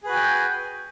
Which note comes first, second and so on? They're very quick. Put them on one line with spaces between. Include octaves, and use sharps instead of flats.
G#4 B4 F#4 G#5 G5